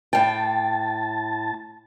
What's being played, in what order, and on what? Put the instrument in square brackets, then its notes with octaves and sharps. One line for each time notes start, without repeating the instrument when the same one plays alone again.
[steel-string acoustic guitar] A2 G5 [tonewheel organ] A5